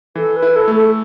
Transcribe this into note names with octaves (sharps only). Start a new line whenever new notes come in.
E3 A4
B4
E4
A4
A3
A4